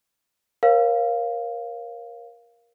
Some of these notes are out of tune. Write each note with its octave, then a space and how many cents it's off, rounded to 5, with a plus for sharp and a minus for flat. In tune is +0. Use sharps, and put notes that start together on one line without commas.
A#4 +15 C#5 -40 F5 +0